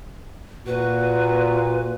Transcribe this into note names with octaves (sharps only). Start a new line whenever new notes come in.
A#2 F#4 B4